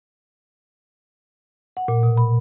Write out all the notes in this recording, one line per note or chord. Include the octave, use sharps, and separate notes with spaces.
F#5
A#2
B2
B5